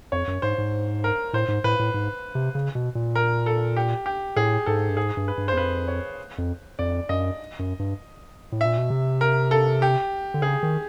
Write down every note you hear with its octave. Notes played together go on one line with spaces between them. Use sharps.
F2 C#5
F#2
G#2 C5
G#2
A#4
A2 C5
G#2
A2 B4
A2
G#2
C3
C#3
B2
A#2
A#4
A4
G4
G4
A2 G#4
G#2 A4
G2
G#2 G#4
G2
B4
G2
C5
E2
F2 B4
C#5
F2
F2 D5
F#2 D#5
F#2
G2
A2
A#2 E5
B2
C3
A#4
A4
G4
D3
C#3 G#4
D#3